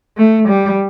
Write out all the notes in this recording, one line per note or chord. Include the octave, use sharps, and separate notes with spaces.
A3
G3